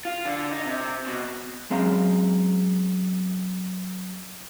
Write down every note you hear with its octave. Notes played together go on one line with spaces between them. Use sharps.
F4
D3
D#4
C3
B2
F#2 G#3 C4 F5 A#5